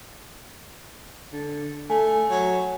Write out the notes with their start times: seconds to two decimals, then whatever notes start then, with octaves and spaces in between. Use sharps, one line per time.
1.32 D3
1.90 A3 G#5
2.30 F#3